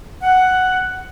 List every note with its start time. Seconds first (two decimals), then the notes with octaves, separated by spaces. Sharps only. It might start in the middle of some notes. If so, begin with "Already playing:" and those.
0.23 F#5